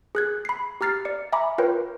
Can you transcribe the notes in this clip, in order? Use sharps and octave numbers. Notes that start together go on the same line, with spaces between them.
G#4 F#6 G#6
B5 C7
G4 A#5 F6 A6 C7
D5 C#7
E5 G#5 A#5 B5 D6
F4 A#4 B4 C#5 G5